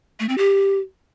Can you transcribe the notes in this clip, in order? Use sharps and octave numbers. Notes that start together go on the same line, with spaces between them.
A3
C4
G4